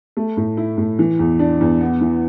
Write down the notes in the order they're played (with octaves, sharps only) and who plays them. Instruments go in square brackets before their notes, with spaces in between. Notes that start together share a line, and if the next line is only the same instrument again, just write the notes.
[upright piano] A3
A2
E4
A2
E3
E2
D4
E2
B3
E3